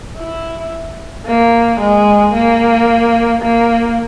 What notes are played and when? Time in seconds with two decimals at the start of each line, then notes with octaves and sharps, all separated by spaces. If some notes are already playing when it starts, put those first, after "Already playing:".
0.18 E4
1.26 A#3
1.80 G#3
2.34 A#3
3.42 A#3